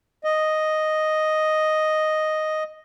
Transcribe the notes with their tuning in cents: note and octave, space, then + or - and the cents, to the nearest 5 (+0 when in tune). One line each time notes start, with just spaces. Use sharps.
D#5 +0